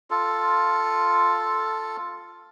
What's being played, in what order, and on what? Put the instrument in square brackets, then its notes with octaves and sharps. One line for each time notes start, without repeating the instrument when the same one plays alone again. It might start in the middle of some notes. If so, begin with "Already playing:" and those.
[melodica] F4 A4